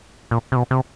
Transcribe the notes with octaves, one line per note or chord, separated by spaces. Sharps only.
A#2
C3
B2
C3